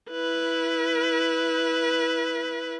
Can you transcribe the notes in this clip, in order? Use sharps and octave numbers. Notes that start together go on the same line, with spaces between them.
E4 B4